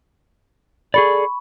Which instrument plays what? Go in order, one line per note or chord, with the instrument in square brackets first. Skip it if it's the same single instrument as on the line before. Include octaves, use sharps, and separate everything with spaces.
[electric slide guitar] G#4 A4 D5 [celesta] B5 C#6